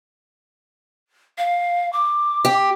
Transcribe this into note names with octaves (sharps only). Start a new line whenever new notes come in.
F5
D6
G4